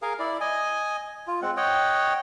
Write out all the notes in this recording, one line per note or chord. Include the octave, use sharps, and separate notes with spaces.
G#4 A#4 F5
E4 D5
D#5 G#5
F4
G#3 C4 F#5
C#5 D#5 F#5 G5